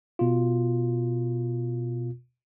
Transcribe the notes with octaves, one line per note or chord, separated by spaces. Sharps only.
B2 F4